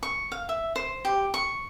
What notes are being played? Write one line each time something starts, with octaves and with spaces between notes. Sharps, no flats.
C#6
F5
E5
C5
G4
C#6